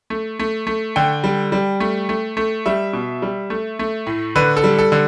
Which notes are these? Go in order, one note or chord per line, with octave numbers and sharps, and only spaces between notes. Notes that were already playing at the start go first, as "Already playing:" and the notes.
A3
A3
A3
D3 G5
G3
G3
A3
A3
A3
G3 E5
B2
G3
A3
A3
A2
D3 B4
A4
G3
A4
D3